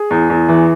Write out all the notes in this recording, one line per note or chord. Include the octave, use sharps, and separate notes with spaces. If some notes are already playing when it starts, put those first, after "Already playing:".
Already playing: G#4
E2
E2
E3